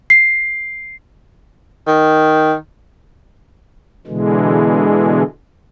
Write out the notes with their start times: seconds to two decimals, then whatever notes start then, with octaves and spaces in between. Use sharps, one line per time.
0.10 C7
1.87 D#3
4.07 B2 D3 E3 G#3